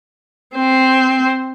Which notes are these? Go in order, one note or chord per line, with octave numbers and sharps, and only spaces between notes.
C4 C5